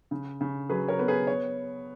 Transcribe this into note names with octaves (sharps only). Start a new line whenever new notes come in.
C#3
C#3
F#3 G#4 B4
A#4 C#5
B3
G#4 B4
C#5